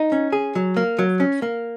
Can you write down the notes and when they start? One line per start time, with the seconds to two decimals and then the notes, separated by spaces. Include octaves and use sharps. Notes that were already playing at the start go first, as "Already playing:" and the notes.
Already playing: D#4
0.12 C#4
0.32 G#4
0.55 F#3
0.77 A#3
0.99 F#3
1.20 C#4
1.42 A#3